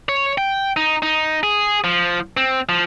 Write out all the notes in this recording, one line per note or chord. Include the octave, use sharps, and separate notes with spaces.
C#5
G5
D#4
D#4
G#4
F3
C4
F3